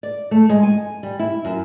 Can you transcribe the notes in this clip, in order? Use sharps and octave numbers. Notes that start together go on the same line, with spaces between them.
D5
A3
G#3
G#5
G3
E4
F#2